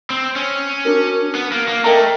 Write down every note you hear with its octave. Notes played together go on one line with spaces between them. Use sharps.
C4
C#4
D4 F#4 A#4
B3
A#3
A#3
A3 A#4 D#5 G5 A#5